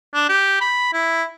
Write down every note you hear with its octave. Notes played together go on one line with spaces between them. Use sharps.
D4
G4
B5
E4